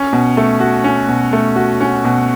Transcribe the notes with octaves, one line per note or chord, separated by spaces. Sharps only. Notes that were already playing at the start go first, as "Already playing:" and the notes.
Already playing: C#4
B2
A3
F#4
C#4
B2
A3
F#4
C#4
B2